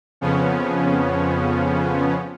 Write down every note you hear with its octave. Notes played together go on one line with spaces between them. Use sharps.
F2 C#3 F3 B3 C#4